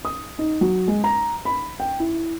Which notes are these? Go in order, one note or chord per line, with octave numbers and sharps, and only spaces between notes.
D#6
D#4
F#3
G#3
A#5
B5
G5
E4